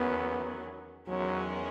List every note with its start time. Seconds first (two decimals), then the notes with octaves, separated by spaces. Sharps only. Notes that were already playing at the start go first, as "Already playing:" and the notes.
Already playing: E2 D#3 F#3 B3 C#4
1.07 E2 D#3 F#3 G#3 C#4